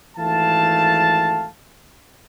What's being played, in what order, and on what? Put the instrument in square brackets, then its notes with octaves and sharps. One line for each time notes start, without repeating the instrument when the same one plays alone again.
[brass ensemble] G#1 E3 A3 F5 A5